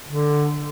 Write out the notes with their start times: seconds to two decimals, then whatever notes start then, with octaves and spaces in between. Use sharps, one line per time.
0.08 D3